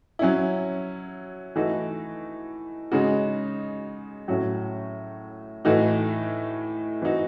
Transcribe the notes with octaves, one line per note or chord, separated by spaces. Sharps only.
F#3 C#4 E4
E3 A3 D#4 F#4
C#3 G#3 D#4 F#4
A2 F#3 C#4 F#4
A2 E3 A3 D#4 F#4
E3 C4 D#4 F#4